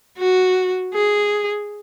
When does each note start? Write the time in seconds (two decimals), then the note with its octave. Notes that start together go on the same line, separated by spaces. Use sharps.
0.18 F#4
0.94 G#4